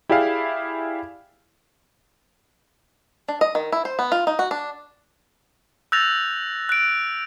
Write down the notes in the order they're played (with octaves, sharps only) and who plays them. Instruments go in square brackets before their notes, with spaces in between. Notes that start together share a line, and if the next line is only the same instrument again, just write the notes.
[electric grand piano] E4 G4 G#4 D5 E5 F5
[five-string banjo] D4
D#5
D#3
E4
C5
B3
F4
D#4
F#4
D4
[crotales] E6 F#6 G6 A6 A#6 F7
F#6 D7